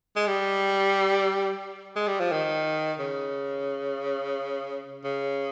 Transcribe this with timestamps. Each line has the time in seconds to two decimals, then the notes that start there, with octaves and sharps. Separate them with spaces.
0.16 G#3
0.27 G3
1.96 G#3
2.08 G3
2.20 F3
2.32 D#3
2.99 C#3
5.04 C#3